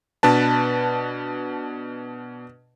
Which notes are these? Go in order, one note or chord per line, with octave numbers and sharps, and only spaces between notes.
B2 D4 B4 A5